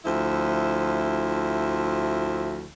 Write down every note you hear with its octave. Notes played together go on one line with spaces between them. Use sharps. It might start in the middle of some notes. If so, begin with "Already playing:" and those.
D2 F3 E4